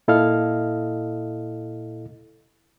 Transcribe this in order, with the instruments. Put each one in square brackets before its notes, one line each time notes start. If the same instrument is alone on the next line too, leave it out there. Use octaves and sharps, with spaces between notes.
[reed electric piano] A#2 E4 A4 D#5 F5 F6